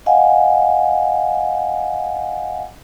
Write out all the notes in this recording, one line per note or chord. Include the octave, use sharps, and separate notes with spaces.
D#5 F5 F#5 G#5